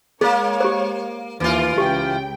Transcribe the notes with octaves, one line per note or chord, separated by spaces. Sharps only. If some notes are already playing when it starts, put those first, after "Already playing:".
G#3 A#3 G#4 C#5 F5
G4 C5
D#2 E3 F4
C#2 G4 G5